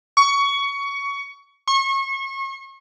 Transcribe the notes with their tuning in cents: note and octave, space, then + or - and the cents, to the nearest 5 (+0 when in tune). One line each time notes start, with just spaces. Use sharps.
C#6 +20
C#6 -35